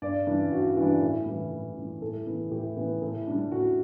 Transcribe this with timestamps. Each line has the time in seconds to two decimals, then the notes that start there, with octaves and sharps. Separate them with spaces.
0.02 G2 D5
0.27 E3 G3 D4
0.51 G2 F#4
0.77 E3 G3 D4
1.02 A2
1.26 E3 G3
1.51 A2
1.76 E3 G3
2.02 A2 A4
2.26 E3 B3
2.51 A2 G4
2.77 E3 B3
3.02 A2
3.27 G3 D4
3.51 A2 F#4